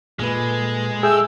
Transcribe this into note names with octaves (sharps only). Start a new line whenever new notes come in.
A#2 G#3 A4 B4
A3 G#4 G5 E6